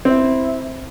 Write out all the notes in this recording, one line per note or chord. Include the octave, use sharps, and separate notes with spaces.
C4 E4